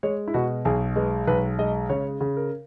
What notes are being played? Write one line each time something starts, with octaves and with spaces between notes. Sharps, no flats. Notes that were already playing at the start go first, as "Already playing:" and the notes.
G#3 C#5
E4
B2 F#4
B1 G#4
G#3 B4
B1 B4
G#3 D#5
C#3 C#5
C#3
A#4